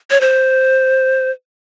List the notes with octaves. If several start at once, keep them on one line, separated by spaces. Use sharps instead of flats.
C#5
C5